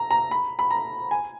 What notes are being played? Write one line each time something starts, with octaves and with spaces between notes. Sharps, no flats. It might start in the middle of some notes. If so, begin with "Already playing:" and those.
Already playing: A#5
A#5
B5
B5
A#5
G#5